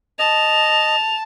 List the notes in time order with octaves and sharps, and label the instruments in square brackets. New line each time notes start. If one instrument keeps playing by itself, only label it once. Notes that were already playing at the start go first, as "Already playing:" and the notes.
[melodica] D#5 [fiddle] A5 [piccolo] F7